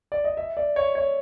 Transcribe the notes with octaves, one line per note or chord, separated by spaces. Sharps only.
D5
D#5
E5
D5
C#5
C#5